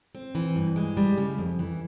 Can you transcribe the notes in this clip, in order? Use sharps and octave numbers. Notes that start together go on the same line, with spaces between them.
C4
E3
G2
G#3
G3
C#3
F2
E3